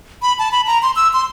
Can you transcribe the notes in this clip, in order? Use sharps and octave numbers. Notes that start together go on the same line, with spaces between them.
B5
A5
B5
A#5
C6
E6
C6